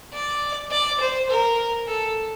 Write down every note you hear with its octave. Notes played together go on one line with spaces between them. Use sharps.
D5
D5
C5
A#4
A4